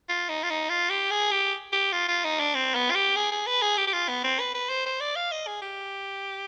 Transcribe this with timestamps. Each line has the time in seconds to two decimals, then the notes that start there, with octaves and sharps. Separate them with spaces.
0.09 F4
0.29 D#4
0.43 F4
0.50 D#4
0.69 F4
0.90 G4
1.11 G#4
1.31 G4
1.72 G4
1.92 F4
2.08 F4
2.24 D#4
2.40 D4
2.55 C4
2.75 B3
2.90 F4
2.95 G4
3.16 G#4
3.32 G#4
3.47 B4
3.62 G#4
3.77 G4
3.87 G4
3.93 F4
4.08 B3
4.24 C4
4.39 B4
4.54 B4
4.69 C5
4.86 C5
5.00 D5
5.15 F5
5.31 D#5
5.47 G#4
5.62 G4